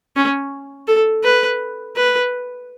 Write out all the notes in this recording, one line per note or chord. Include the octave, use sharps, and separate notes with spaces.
C#4
A4
B4
B4